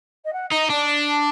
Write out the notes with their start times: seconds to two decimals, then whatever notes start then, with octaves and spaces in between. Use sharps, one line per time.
0.24 D#5
0.33 F#5
0.52 D#4 D#5
0.70 D4 D5
1.09 A5